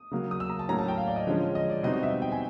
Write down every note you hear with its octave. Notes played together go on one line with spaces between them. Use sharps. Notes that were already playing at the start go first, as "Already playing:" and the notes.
Already playing: D#6
C#3 F#3 A#3
D#6
E6
A#5
A5
A2 F#3 A#3 C#4 A#5
A5
G5
F5
D5
D#5
D3 F3 G#3 C#4
D#5
D5
B2 G3 C4 D#4 D#5
D#5
E5
G5
G#5